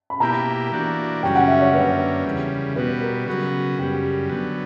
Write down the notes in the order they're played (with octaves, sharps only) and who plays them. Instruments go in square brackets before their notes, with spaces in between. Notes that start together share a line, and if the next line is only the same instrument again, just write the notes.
[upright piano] B5
[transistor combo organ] B2 A#3 E4 G4 [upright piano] A#5
[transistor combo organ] E3 A#3 D4 F#4
[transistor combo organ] F#2 C#3 G3 C#4 F#4 [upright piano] G5
[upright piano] F#5
E5
C#5
[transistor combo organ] F#2 D3 A#3 C#4 [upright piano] B4
[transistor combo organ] E2 C#3 G3
[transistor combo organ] B2 G3 B3 F#4 [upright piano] B4
[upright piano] A#4
[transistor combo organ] C#3 F#3 B3 F#4
[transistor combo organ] F#2 C#3 G3 [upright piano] G4
[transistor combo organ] D3 F#3 B3